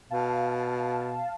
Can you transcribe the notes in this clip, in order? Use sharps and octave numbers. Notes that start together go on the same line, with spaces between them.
B2 F5 A5